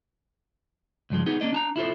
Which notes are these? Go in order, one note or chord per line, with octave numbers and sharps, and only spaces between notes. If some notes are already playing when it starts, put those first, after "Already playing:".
C#2 G2 F3 G#3
B3 D#4 G#4
A#3 C#4 D4 D5 D#5
D4 A5 A#5
E4 F4 A4 C5